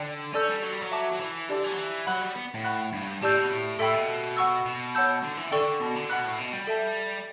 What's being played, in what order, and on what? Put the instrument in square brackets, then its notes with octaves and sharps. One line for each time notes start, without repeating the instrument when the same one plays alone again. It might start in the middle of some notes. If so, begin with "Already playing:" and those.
Already playing: [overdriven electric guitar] D3 [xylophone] D5 G5
[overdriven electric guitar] C#4 [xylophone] A4 D5 A5 E6 G6
[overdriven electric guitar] G3
F#3
G3
F#3
[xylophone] E5 A5 D6
[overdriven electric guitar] F#3
E3
[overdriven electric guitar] D3 [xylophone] G4 D5 A5
[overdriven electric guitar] E3
F#3
E3
[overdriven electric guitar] F#3 [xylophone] F#5 B5 F#6
[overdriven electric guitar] G3
B3
A2
[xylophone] F#5 B5 F#6
[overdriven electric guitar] G2
[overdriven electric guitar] A2 [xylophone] G4 D5 A5 E6 G6
[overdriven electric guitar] B2
A2
[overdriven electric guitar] A2 [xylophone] A4 E5 G5 B5 E6
[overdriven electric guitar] B2
[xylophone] F#5 C#6 E6
[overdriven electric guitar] B2
[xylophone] C#5 F#5 A5 E6 G6
[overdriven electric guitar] D3
E3
[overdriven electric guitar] D3 [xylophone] A4 D5 G5 C#6
[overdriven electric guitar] B2
D3
[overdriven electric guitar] B2 [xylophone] F#5 B5 F#6
[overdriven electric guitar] A2
B2
G3
[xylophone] A4 E5 A5